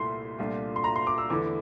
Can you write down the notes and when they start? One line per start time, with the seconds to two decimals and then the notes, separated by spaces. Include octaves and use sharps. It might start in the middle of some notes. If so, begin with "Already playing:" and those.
Already playing: C2 A#2 A3 E4 C6
0.39 C2 A#2 A3 D4 F4
0.76 C6
0.84 A#5
0.96 C6
1.07 D6
1.18 E6
1.30 E2 D3 A3 E4 D6